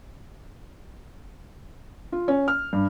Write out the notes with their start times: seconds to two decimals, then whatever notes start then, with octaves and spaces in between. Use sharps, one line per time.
2.12 F4
2.28 C#4
2.48 F6
2.73 G2